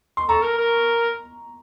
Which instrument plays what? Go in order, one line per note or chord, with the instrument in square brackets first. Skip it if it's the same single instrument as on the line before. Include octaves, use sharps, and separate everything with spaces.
[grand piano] C6
[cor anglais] A4 [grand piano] A#5 C#6
[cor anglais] A#4
A#4